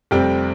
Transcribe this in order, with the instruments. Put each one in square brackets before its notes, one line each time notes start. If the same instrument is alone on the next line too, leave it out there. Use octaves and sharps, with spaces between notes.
[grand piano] F1 F2 C3 G3 C4 G5